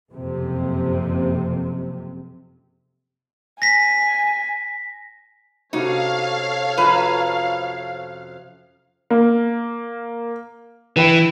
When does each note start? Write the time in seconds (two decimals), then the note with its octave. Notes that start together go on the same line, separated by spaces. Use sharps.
0.12 F#1 F2 C3
3.62 G#5 A#6 B6
5.73 C3 C#4 D#4 F#4 A4 C#5 F5
6.78 F2 B4 E5 A#5
9.10 A#3
10.96 E3 B4 G5 B5